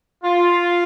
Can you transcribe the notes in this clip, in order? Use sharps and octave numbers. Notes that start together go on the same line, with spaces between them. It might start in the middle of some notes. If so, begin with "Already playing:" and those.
F4